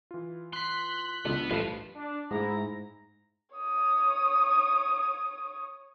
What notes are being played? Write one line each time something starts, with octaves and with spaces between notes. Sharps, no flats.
E3 F4
C6 F#6 B6
C#2 B3 D4 C6 E6
A1 F3 G3 A3 B4 F5 A5
D4
G#2 A3 E4 G#4 A#5
C#5 D#6